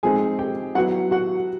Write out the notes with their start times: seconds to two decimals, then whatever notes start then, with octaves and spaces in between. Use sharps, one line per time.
0.03 F3 G#3 C4 D#4 G#4 G#5
0.39 G4 G5
0.75 F#3 B3 E4 F#4 F#5
1.11 F#4 F#5